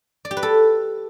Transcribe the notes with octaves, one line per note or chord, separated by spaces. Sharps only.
D5
G4
B4
A4